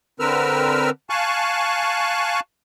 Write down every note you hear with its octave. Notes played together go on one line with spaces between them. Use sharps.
D3 C4 A#4 B4 E6 F6
F5 G#5 A5 C#6 F#6